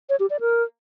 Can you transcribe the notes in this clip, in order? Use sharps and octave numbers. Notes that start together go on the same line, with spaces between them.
C#5
G4
D5
A#4